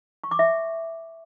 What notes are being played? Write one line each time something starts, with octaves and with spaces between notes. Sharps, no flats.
C#6
D6
E5